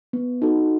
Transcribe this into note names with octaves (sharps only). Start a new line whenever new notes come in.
B3
D#4 F#4 A4